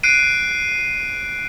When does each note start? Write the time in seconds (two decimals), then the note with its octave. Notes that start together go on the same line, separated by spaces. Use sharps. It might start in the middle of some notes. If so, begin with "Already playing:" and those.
0.03 F#6 C7 D7 D#7